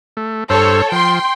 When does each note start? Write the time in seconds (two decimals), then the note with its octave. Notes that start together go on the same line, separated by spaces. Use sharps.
0.17 A3
0.50 G2 A4 C5 C#5 E6
0.92 F3 G5 C6